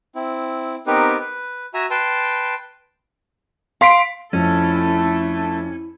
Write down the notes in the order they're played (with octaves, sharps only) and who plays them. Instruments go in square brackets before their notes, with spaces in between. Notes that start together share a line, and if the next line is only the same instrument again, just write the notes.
[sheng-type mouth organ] C4 E4
B3 C4 D#4 G4 A#4 B4
B4
F#4 E5 G#5 A#5
B4 G5 A5 C6
[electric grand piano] F5 B6 D7 [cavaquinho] C6
[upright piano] F2 [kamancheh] A3 A4 [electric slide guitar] C#4 [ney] E4